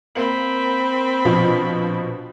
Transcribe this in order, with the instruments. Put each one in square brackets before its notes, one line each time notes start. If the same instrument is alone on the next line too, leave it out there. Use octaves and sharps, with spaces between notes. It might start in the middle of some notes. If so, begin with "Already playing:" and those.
[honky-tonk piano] A#3 F#7 [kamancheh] C4 B5
[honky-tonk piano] A#1 B2 F3